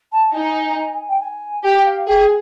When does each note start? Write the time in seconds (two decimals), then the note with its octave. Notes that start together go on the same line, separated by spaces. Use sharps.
0.12 A5
0.33 D#4 G#5
1.09 G5
1.20 G#5
1.64 G4 G5
1.85 F5
2.07 G#4 G5